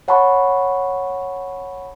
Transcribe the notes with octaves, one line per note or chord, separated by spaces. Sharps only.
C#5 F#5 A5 B5 C#6